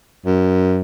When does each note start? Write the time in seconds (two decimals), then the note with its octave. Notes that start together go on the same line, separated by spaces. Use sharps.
0.26 F#2